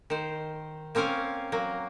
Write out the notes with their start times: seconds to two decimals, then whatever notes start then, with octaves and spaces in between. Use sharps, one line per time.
0.10 D#3 C5
0.95 A#3 C4 C#4 A#4 F5 G#5
1.52 F#3 A#3